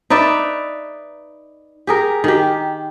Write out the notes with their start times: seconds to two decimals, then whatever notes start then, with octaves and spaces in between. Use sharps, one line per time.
0.10 D#4 B4 D5 E5
1.87 G4 G#4 A#4
2.24 D#3 G4